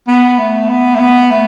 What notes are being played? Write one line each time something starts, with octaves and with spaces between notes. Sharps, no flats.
B3
A3
B3
A3
B3
A3